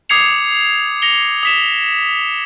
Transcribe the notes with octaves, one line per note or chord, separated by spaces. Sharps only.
D6 D#6 G#6 C7 C#7 F7
A#6 C#7 F7 G7
D#6 B6 E7